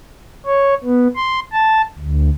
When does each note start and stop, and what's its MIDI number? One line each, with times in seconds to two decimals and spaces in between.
0.46 0.74 73
0.84 1.08 59
1.16 1.40 84
1.53 1.82 81
1.99 2.30 38